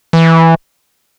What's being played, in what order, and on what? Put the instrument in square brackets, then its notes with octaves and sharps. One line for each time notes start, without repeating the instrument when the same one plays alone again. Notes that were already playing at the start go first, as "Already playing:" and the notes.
[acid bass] E3